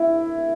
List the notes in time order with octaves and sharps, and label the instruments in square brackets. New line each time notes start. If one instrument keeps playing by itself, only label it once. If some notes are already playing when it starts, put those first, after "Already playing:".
Already playing: [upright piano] E4